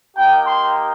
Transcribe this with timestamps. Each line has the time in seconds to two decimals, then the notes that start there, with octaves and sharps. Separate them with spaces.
0.16 A#3 D#4 G4 G5
0.46 C6